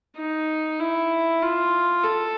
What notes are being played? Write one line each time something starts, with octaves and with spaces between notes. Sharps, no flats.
D#4
E4
F4
A4